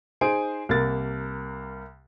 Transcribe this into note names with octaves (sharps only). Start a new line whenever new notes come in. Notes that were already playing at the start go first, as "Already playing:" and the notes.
D#4 G#4 C5 G#5 D7
C2 A#3 A#4 A6